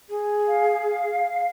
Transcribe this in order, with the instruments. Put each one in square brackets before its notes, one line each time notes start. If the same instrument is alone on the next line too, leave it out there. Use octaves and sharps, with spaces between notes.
[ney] G#4
[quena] F5